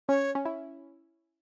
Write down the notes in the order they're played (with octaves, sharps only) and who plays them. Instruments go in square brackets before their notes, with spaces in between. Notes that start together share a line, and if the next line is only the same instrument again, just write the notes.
[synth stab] C#4 [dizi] C#5
[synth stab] C#4
E4